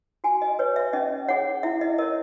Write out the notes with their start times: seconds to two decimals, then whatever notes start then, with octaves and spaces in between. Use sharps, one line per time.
0.24 F#4 G#5
0.42 D#5
0.59 B4 C#5
0.76 E5
0.93 C#4 D#5
1.28 G#4 C#5 F#5
1.63 E4 E5
1.81 D#5
1.98 A#4 C#5 D#5